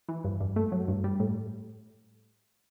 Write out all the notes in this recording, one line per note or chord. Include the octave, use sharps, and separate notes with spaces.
E3
G2
G2
A3
F#3
G2
G3
A2